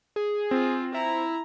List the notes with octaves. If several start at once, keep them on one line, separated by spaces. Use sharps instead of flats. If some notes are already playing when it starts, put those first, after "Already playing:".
G#4
C4 F4
E4 A#5